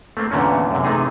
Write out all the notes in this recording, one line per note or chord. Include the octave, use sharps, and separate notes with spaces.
A3 A#3 C4
E2 A#2 D3 A3 C#4
F#2 C3
C3 E3 A3 D#4 G#4